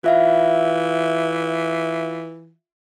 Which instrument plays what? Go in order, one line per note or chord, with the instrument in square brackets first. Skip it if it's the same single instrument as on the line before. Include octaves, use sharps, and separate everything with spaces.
[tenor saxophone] E3 [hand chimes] F4 E5 F5